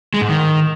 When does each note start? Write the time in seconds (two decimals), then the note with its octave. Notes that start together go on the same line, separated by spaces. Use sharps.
0.14 G#3
0.21 G#2
0.29 D#3